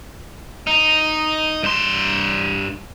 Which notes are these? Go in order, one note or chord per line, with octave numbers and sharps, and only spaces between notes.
D#4
G2 C6